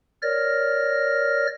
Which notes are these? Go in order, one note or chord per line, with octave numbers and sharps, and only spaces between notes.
A#4 C#5 D5 F6 A#6